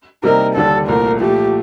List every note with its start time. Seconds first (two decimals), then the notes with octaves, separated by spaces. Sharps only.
0.23 C3 G3 A#3 D#4 A#4
0.55 D#2 D3 G3 D4 A4
0.88 C2 A#2 A3 A#4
1.21 A#2 F3 A3 G4